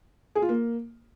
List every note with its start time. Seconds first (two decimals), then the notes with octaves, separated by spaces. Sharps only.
0.35 G#4
0.42 F4
0.49 A#3